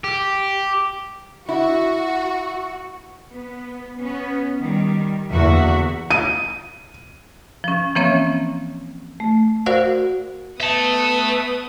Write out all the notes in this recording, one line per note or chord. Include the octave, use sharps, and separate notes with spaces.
G4
E4 F#4
B3
B3 C#4
D#3 G3
E2 D3 A#3 F#4 E5
D#7
F3 C#4
E3 F3 A#3 C4 C#4 C#5
A3
F#4 A#4 C5 D5 F5 F#5
B3 E5 A5 D#6